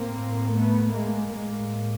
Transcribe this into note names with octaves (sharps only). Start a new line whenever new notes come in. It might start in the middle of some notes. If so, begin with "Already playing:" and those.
Already playing: A2 A#3 C4
A3 B3
G#3 A#3
A2 G#3 A#3